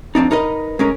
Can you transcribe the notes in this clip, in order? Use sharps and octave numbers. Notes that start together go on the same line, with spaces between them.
F3 C4 D4 D#4
D#4 A#4 B4 D#5
G#3 C#4 A#4